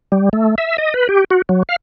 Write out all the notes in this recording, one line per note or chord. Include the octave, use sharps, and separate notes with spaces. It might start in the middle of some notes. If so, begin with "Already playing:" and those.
G3
A3
E5
D#5
B4
G4
F#4
F#3
F5